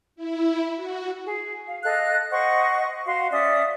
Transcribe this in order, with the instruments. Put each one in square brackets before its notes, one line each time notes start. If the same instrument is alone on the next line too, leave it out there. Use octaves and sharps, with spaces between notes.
[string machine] E4
F#4
[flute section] G#4
F5
A4 D#5 F5 F#6
C5 D#5 F#5 C#6
F#4 F5 C6
C#4 D5 E5 D#6